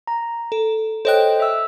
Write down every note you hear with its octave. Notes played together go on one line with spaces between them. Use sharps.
A#5
A4
A4 C5 C#5 D#5 G5 F#6
E5 E6